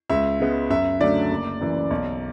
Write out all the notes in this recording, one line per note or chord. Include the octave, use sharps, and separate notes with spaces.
C#2 E5
C#3 G#3 B3
F#2 E5
D3 F#3 A3 D5
F#1
F#2 E3
B1